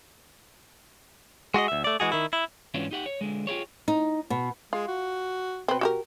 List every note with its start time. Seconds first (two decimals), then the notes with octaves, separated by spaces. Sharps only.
1.54 G#3 F#4 G#4 D#5
1.68 D2 E5
1.84 A3 D5
2.00 E3 G#3 F#4 G#4
2.12 D#3 E4
2.33 E4
2.74 G#2 E3 C#4 D4 F4 F#4
2.91 D#4 G4 F#5
3.06 C#5
3.21 D3 G#3
3.47 F4 G4 G#4 C#5
3.88 D#4
4.30 B2
4.73 G#3 F4
4.88 F#4
5.68 B2 C4 B4
5.81 F#4 G4 A#4